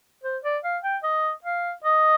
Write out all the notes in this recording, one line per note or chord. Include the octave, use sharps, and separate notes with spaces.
C5
D5
F5
G5
D#5
F5
D#5